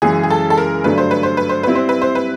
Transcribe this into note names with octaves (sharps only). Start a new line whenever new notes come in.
F#2 C#3 E3 G#3 G#4
G#4
A4
A4
A#4
G2 D3 F#3 A3 B4
C5
B4
C5
B4
C5
G3 C4 E4 B4
C5
B4
C5
B4